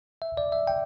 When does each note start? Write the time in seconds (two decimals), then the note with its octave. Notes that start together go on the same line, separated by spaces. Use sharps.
0.22 E5
0.37 D5
0.52 E5
0.67 G5